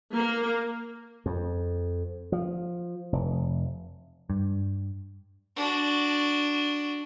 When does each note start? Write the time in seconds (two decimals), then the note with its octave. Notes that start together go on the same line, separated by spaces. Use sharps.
0.14 A#3
1.26 F2
2.32 F3
3.12 F1
4.30 G2
5.56 D4 F#4